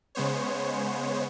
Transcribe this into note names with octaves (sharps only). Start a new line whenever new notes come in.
C#3 G#3 B3 C5 C#5